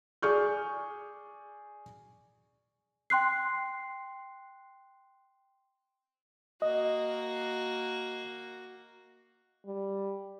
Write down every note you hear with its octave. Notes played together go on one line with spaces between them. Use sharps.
G#4 D5 C#6 F6 G6
G5 C6 F#6 C7
A#3 F#4 D#5
G3